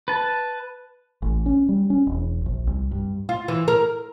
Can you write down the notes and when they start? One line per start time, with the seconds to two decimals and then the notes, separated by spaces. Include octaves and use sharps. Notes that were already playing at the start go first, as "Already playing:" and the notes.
0.08 B4 A5
1.22 A1
1.46 C#4
1.69 G3
1.90 C#4
2.07 E1
2.46 A#1
2.67 C2
2.91 G2
3.29 F4
3.48 E3
3.68 A#4